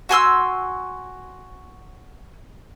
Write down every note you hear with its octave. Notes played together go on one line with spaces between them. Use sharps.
F#4 G#5 C6 E6